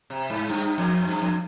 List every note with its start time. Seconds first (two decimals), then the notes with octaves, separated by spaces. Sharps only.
0.10 C3
0.30 G#2
0.49 G2
0.78 F2
1.07 G2
1.22 F2